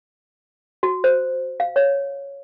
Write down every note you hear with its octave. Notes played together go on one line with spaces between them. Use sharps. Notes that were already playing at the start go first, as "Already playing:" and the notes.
F#4
C5
F5
C#5